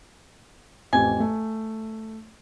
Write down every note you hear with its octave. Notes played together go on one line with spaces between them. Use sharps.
A1 F2 G#5
A3